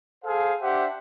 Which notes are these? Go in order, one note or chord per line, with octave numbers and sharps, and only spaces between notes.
G#4 A4 C5 F5
D4 G4 C5 E5 F#5